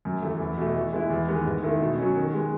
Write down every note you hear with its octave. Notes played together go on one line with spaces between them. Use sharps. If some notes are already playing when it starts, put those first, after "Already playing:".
F#2
E3 A3
E2
B2 A3
E3
G#3 B3 E4
E2
D#3 G#3 B3
G#2
D#3 A3 E4
B2
F#3 C#4
D#3
G#3 B3